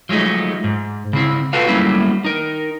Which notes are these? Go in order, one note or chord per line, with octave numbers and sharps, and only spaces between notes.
F3 F#3 G#3 A3 D#4
G#2
C#3 C4 E4
F4 F#4 A4 B4 F5
F#3 G3 A3 A#3 C#4 E4
D#4 A#4